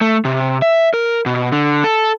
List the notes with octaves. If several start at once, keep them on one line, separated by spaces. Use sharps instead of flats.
A3
C3
E5
A#4
B2
D3
A4